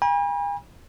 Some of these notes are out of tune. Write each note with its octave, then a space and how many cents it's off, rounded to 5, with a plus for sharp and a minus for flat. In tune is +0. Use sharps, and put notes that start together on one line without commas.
G#5 -45 B5 -45